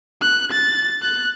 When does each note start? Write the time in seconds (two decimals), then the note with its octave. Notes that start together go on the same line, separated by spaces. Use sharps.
0.21 F#6
0.52 A6
1.02 F#6